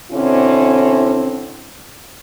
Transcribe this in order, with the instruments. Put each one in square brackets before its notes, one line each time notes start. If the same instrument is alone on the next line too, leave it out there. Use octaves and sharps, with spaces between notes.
[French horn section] B2 D3 C4 C#4 E4